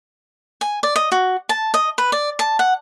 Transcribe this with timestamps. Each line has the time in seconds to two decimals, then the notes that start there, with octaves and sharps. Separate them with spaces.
0.61 G#5
0.83 D5
0.96 D#5
1.12 F#4
1.49 A5
1.74 D#5
1.98 B4
2.12 D5
2.39 A5
2.59 F#5